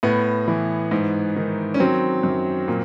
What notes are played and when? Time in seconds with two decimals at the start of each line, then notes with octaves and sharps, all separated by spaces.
0.03 A2 B3
0.48 E3
0.91 G#2
1.36 D#3
1.74 C#4
1.80 F#3 C4
2.23 F#2
2.68 A#2